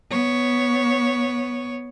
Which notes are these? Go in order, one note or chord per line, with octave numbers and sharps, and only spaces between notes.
B3 C#5